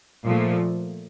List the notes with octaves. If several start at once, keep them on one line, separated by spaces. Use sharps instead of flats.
A#2 F3 A3